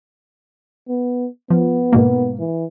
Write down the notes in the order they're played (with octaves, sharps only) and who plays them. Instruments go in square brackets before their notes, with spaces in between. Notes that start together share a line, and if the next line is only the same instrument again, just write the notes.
[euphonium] B3
[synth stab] F3 [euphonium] B3
[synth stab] G#2 B2 A#3
[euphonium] E3